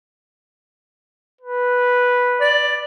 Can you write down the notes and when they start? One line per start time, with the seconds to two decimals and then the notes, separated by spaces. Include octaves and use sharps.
1.41 B4
2.40 D5